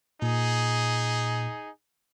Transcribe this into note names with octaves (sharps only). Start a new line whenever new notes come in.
A#2 D#4 G#4